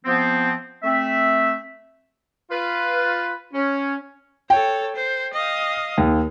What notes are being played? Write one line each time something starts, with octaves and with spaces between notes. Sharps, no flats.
F3 B3 C4
A3 C4 E5
F4 B4
C#4
A4 C#5 G5
C5
D#5 F5
D#2